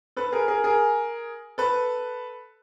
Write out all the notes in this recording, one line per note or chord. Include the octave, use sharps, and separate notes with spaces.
A4 B4
G#4 A#4
G#4 A#4
G#4 A#4
A4 B4